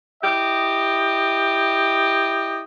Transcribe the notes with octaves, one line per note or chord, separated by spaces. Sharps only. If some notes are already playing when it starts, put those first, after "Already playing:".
E4 G4 D#5